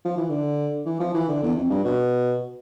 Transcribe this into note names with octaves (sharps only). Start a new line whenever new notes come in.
F3
E3
D3
E3
F3
E3
D3
E2
F2
G2
B2